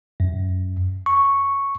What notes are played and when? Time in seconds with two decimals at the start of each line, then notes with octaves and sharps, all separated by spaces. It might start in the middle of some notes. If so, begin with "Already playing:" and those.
0.20 F#2
1.06 C#6